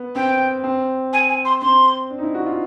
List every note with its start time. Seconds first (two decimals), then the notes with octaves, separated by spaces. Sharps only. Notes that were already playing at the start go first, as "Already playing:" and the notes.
Already playing: B3
0.15 C4 G5
0.64 C4
1.13 G#5
1.29 G#5
1.45 C6
1.61 C4 C6
2.10 D4
2.18 D#4
2.23 E4
2.34 F#4
2.47 F4